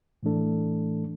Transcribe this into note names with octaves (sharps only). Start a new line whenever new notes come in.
A2 E3 A3 D4 A4